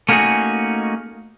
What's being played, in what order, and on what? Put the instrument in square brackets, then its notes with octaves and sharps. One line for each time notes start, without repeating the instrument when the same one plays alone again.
[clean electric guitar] A3 A#3 C#4 D#4 F#4 G#4